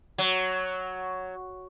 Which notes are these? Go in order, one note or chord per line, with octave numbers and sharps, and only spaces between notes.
F#3